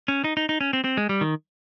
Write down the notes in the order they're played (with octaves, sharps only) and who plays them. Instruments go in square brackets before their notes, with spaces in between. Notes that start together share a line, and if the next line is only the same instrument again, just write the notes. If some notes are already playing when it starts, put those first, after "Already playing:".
[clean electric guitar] C#4
D#4
D#4
D#4
C#4
C4
C4
G#3
G3
D#3